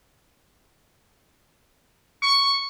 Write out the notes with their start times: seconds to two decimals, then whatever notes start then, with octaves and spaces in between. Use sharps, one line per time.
2.23 C#6